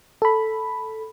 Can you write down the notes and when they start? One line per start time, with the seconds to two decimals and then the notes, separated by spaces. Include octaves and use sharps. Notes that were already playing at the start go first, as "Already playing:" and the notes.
0.22 A4 B5